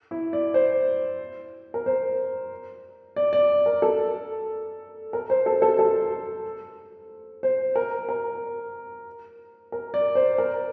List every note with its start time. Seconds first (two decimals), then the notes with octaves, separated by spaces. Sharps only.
0.11 E4
0.33 D5
0.54 C5
1.74 A#4
1.86 C5
3.16 D5
3.33 D5
3.66 A#4
3.82 A4
5.13 A#4
5.30 C5
5.46 A4
5.62 A4
5.79 A4
7.43 C5
7.76 A#4
8.09 A#4
9.72 A#4
9.94 D5
10.15 C5
10.38 A#4